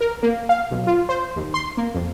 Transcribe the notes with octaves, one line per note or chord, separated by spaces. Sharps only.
A#4
A#3
F5
B1
F4
C5
D#2
C6
A#3
F2